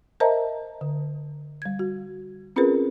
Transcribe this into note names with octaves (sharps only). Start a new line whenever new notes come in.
A#4 C5 D#5 E5 A5 A#5
D3
G3 G#6
F#4
C4 C#4 F4 G#4 A#4 B4